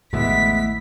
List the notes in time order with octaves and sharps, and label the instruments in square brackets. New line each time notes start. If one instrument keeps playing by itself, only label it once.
[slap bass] A1 D#2 D3 [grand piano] G#3 B3 E4 [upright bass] A3 [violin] B6